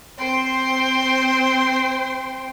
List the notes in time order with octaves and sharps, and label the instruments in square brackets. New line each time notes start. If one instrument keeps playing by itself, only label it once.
[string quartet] C4 C5 G5 C6